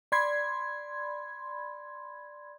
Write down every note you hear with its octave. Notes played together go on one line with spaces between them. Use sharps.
D5 B5 C6 G#6